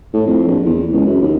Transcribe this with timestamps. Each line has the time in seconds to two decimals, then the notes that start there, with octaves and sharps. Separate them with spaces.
0.14 A2
0.27 F2
0.47 A#1
0.66 E2
0.92 C#2
1.06 F#2
1.22 D#2